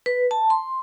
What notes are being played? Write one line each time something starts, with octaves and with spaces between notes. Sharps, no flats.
B4
A5
C6